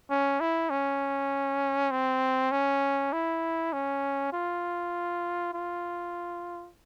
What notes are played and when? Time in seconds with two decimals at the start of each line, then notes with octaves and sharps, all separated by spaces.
0.10 C#4
0.40 E4
0.70 C#4
1.91 C4
2.51 C#4
3.13 E4
3.73 C#4
4.33 F4
5.53 F4